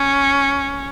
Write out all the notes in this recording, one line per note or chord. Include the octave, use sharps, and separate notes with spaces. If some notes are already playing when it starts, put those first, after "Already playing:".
Already playing: C#4